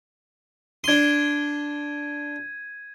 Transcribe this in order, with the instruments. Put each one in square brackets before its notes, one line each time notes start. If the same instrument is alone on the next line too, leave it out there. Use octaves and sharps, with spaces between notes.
[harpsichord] D4 C6 [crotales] G#6 D#7